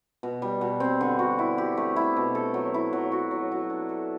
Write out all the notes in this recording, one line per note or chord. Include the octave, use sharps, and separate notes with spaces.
B2
G3
B2
C4
D3
F#4
E4
G4
A3
E4
B2
A4
F#3
E4
F#3
F#4
F#3
F#3
D4
A4